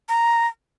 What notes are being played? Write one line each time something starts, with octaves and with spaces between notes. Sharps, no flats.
A#5